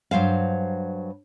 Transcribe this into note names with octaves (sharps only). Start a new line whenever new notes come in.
G2 F#3 C5 F5